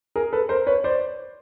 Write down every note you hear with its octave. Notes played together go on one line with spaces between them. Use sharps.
G#4 A#4
A4 B4
A#4 C5
B4 C#5
C5 D5